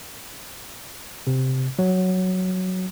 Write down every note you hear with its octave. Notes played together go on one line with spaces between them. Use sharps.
C3
F#3